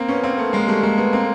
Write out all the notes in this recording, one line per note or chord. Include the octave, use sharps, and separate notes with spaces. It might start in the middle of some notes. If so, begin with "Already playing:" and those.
Already playing: A#3 C4
B3 C#4
A#3 C4
A3 B3
G#3 A#3
G3 A3
G#3 A#3
A3 B3
A#3 C4